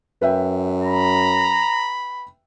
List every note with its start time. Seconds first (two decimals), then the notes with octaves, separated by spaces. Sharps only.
0.21 F#2 B4 E5 G5
0.83 A#5 B5